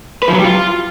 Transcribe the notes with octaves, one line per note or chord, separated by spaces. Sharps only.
B4
F3
F#3
G3
F4